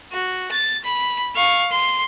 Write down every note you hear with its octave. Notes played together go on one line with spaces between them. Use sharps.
F#4
A6
B5
F5 C#6
C6